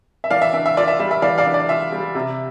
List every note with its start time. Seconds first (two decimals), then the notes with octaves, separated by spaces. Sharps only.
0.24 E5
0.31 E3 D5 F5
0.42 E5
0.53 D4 E5
0.66 E5
0.77 F4 D5
0.88 E5
1.00 G3 E5
1.11 E5
1.22 E3 D5 F5
1.38 D5 F5
1.46 D4
1.54 D5
1.69 F4 E5
1.92 G3
2.15 C3